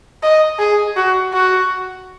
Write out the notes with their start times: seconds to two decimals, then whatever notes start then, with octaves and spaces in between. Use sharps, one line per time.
0.23 D#5
0.59 G#4
0.96 F#4
1.33 F#4